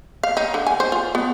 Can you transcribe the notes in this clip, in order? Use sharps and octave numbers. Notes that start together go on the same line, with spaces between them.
F5
D#4
D3
G#5
C5
F4
B3